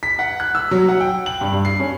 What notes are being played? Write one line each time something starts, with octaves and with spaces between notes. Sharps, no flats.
B6
F#5
F#6
E6
F#3
F#5
G5
F#7
G2
G2
C7
C#4